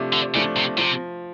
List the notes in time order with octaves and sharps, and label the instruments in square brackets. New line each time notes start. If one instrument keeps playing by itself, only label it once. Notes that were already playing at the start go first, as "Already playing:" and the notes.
Already playing: [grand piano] C3 F3 A3 D4
[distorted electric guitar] D3
[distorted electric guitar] C#3 [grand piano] F3 A3 D4
[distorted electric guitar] C3
[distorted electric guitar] C3 [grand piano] F3